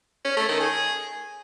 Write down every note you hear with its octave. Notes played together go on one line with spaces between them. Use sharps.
C#4
A3
D#3
G#4